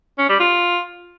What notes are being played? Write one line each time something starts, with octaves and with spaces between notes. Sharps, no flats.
C#4
G3
F4